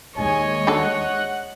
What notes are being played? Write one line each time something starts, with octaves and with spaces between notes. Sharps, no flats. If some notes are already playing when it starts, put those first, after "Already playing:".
D#2 G#3 C#5 D#5 G#5
D4 F#4 A4 F#5